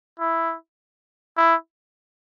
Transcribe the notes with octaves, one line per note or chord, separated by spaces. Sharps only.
E4
E4